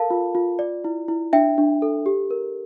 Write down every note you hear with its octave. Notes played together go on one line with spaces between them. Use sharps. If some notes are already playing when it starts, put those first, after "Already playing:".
Already playing: A4 A#4 F5 A5
F4
F4
D5
E4
E4
D4 E5 G5
D4
A4
G4
A#4